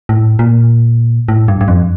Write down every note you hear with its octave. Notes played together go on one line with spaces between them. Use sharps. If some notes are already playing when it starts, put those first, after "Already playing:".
A2
A#2
A2
G2
G2
F2